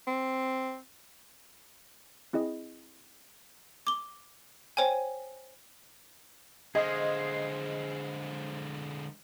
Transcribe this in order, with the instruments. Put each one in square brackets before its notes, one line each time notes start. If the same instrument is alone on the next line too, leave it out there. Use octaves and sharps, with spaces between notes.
[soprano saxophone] C4
[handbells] C4 E4 G#4 D#5
[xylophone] D6 G7
C5 C#5 G5 G#5
[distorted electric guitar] D3 G#3 [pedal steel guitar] G#4 C5 F5 [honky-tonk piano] D#5